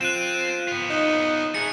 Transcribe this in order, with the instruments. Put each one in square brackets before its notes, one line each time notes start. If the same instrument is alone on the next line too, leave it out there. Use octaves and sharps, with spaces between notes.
[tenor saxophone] F3 [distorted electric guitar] C4 [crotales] F#6 D#7 E7
[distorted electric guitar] B3 F4
[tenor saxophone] D#4
[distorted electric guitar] A3 D#4 [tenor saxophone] G#4 [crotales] C#7